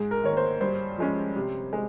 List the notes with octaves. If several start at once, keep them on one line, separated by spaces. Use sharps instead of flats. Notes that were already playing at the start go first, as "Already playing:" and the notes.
Already playing: G#2 G#4
A#4
D#3 A#3 C#5
C5
G2 C5
F3 G#3 C#4
C3
G#3